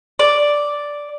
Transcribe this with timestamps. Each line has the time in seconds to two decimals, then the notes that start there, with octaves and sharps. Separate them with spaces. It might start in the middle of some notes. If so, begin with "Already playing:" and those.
0.19 D5